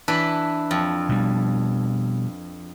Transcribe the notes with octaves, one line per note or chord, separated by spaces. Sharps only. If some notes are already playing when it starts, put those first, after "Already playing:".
E3 D4 B4
F2
B2 G3